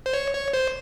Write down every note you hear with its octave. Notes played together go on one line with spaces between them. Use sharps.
C5
C#5
C#5
C5